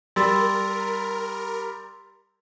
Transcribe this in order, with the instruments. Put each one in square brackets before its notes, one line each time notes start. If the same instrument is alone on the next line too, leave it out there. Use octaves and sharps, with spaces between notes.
[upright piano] G3 [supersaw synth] A#4 [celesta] C6 E6 A6